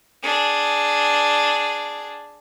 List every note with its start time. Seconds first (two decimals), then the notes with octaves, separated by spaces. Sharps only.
0.23 D4 G#4